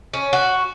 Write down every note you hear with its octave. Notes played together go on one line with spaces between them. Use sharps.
C#4
F#4